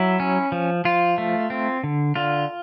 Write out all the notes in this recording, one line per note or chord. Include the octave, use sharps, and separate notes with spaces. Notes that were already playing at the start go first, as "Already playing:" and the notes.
Already playing: F#3 E4
C#4
F3
F3 F4
A3
C4
D3
D3 F4